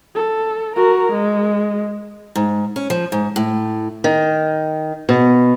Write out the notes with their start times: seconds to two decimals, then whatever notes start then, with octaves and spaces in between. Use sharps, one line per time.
0.15 A4
0.76 F#4 A#4
1.12 G#3
2.36 G#2
2.76 C#4
2.90 F3
3.12 G#2
3.36 A2
4.04 D#3
5.09 B2